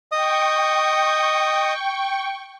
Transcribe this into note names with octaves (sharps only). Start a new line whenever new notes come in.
D#5 G5 C#6 D#6